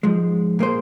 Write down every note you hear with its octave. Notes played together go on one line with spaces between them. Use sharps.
G#2 F3 G#3
A#2 A#3 G#4 C5